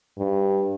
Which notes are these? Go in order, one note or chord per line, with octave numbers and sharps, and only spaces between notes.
G2